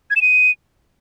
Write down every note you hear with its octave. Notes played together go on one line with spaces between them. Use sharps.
G#6
E7
D#7